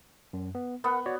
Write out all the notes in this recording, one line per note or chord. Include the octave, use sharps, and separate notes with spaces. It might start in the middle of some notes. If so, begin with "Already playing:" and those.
F#2
B3
B3 A#4 F#5
F#4 C#5 D5